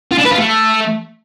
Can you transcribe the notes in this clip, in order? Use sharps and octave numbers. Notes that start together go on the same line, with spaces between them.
F4
D4
B4
F4
A3